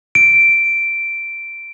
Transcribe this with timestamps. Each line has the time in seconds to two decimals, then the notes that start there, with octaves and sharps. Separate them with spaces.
0.15 D7